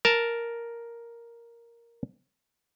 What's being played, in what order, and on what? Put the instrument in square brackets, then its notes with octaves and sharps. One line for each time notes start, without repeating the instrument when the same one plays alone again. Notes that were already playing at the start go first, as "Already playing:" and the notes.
[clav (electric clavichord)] A#4 A5